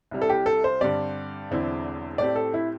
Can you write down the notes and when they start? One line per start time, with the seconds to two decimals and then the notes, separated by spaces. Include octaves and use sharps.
0.11 C2 C3 G3 E4
0.22 A4
0.30 G4
0.46 A4
0.64 C5
0.81 G2 D3 G3 C4 G4 D5
1.50 E1 E2 D3 C4 E4
2.18 A2 A3 C4 G4 D5
2.36 A4
2.54 E4